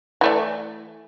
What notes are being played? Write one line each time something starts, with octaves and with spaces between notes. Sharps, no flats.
E3 A3 D5